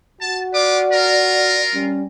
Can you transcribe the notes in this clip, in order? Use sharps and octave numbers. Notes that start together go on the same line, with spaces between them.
F#4 A5
F4 B4 D5 D6
F4 A#4
G3 C#4